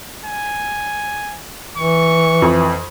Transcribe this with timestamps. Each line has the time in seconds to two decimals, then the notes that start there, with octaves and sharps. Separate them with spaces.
0.25 G#5
1.78 E3 C#6
2.42 F2